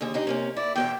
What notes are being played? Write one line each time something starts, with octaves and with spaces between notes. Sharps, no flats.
D#2 D3 G#4
D4 D#4 G4
C3 A#3 C#4
E4 D5
E2 B2 E3 G5